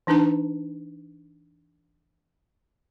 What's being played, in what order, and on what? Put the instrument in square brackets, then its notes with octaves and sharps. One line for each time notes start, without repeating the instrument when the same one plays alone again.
[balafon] E3 D4 D#4 B4 A5